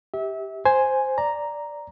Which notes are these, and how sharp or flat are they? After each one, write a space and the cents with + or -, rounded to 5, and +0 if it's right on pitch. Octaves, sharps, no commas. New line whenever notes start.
G4 +0 E5 -30
C5 +0 G#5 +0
D5 +0 A#5 +0